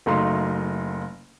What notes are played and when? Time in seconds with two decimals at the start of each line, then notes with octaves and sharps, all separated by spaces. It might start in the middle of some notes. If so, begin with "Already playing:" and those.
0.06 F#1 F#3 A3 D#4 F5 C6